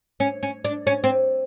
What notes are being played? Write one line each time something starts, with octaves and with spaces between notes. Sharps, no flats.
C#4
C#4
D4
C#4
C4